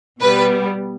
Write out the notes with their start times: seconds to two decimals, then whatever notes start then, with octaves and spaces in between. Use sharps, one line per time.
0.20 B2 G3 B3 B4